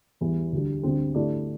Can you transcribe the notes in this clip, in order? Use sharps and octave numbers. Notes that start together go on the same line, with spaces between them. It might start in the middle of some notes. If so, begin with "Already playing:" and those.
E2 E3 G3
D2 D3 G3
D2 D3 G3 C4
D3 A3 E4 G4 D5